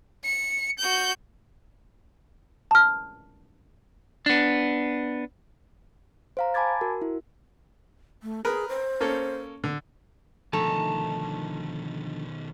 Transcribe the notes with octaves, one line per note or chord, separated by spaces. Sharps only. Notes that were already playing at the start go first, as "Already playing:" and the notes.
C#7
F#4 G6
A5 F6
B3 D4
C5 F5 A#5
G#5 A5 B5 D6 G#6 A6
F#4 A#4
E4
A3
G#4 A#4 B4
C5
A#3 C#4 A4
D3
B2 D3 D#3 F3 A3 D#4 A5 A#5